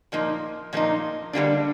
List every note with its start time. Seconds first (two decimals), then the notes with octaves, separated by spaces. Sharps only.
0.12 A#2 F3 A#3 D#4
0.73 A#2 F3 A#3 D#4
1.33 D3 G3 A#3 D4